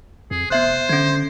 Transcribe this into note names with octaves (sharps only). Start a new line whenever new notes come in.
F2 G#4
F1 B3 C5 E5 F#6
D3 C#4 G#6